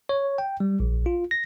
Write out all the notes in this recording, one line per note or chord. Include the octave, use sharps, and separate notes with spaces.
C#5
G5
G3
A#1
F4
A#6